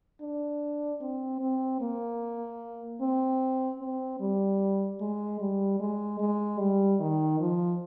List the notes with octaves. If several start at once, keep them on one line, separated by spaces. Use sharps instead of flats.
D4
C4
C4
A#3
C4
C4
G3
G#3
G3
G#3
G#3
G3
D#3
F3